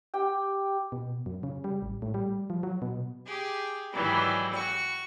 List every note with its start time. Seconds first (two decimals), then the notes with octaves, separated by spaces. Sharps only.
0.14 G4 G5
0.92 B2
1.26 F#2
1.43 C#3
1.64 G3
1.82 A1
2.02 A2
2.14 G3
2.50 F3
2.63 F#3
2.82 B2
3.25 G4 G#4
3.93 G#2 D#3 E3 F#3 G3
4.53 F#4 C#6